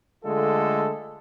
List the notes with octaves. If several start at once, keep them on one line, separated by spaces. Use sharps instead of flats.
D3 G#3 A3 F4 A4